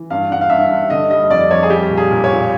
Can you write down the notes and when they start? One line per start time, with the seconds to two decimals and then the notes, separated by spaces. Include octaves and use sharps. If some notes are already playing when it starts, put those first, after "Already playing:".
Already playing: E3
0.10 G2 F5
0.30 G2 F#5
0.41 F5
0.50 G2 E5
0.70 G2
0.90 D3 D#5
1.10 G3 D#5
1.30 F2 D5
1.51 F2 C#5
1.63 G#4
1.70 G3 G4
1.90 A#2
1.97 G#4
2.10 A#2
2.24 C#5
2.30 A#2